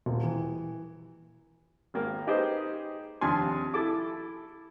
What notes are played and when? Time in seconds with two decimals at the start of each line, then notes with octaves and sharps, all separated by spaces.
0.06 D#1
0.23 E3
1.94 G#1 A#3
2.27 D#4 G4 G#4 B4 C5 D#5
3.21 D#2 C3 F3 D4 G#5 C6
3.74 E4 A4 D6